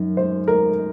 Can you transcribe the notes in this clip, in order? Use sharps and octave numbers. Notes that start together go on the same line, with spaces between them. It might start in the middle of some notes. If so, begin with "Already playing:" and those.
Already playing: F#2 D#3
C5
A#4